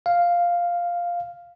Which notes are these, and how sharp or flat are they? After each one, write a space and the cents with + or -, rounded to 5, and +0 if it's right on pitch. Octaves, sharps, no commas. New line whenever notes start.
F5 +0